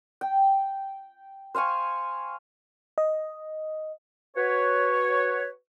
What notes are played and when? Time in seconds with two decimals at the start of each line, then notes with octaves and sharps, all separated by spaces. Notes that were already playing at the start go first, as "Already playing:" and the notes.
0.21 G5
1.55 C5 F5 G#5 C#6
2.98 D#5
4.36 F#4 B4 C#5